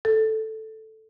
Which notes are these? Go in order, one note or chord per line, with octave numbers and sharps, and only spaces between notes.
A4